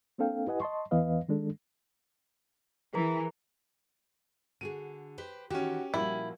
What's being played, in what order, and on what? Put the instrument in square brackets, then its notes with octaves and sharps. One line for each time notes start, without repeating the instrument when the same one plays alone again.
[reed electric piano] A#3 C4 D4 A4 F5 G5
E4 G4 B4 D#5 F#5 G#5
D#5 A5 C6 C#6
E2 E3 B3 B4 D#5 F5
D#3 G#3 D4 A4
[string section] E3 [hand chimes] G#4 A#4 A#5
[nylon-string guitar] D3 F#4 G#4 [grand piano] D#7
[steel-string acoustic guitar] G4 B4 C5
[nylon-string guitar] D#3 E3 [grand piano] C#4 G4 [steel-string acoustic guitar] F#4
[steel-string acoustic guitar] A#2 [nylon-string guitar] F3 G3 F#4 [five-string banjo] E4